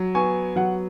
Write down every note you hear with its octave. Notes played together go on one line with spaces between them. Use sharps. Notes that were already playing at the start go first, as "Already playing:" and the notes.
Already playing: F#3
B3 G#5 C#6
F#3 F#5